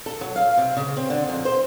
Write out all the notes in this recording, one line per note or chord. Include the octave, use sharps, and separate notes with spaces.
A4
F#3
F5
C3
C#3
C4
D3
F2
C5